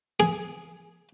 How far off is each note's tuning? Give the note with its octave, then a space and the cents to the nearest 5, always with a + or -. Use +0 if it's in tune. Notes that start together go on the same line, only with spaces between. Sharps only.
G#4 +5